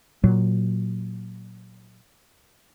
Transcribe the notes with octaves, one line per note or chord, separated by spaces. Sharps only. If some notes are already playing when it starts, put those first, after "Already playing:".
A#2 F#3